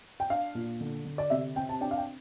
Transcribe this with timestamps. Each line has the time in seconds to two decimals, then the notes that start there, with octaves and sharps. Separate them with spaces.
0.20 G5
0.30 D4 F5
0.55 A#2
0.81 D3
1.05 D3
1.18 D5
1.30 C3 E5
1.56 C4 G5
1.69 A5
1.81 D4 G5
1.91 F5
1.98 G5